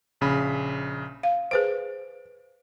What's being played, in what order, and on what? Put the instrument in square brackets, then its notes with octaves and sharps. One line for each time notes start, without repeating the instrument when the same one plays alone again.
[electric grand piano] A#1 C#3 B5
[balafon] F5
[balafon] G#4 B4 C5 [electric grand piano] D7